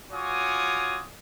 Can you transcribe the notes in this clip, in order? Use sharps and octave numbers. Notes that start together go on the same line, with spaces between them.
F4 F#4 C#5 G#5 D6 D#6